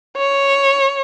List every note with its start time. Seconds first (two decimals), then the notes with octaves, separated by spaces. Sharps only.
0.17 C#5